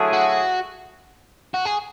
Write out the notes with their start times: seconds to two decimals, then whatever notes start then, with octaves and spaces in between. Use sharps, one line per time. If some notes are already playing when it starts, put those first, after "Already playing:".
Already playing: D3 F#3 A3 E4 G#4
0.13 F#4
1.54 F#4
1.65 G#4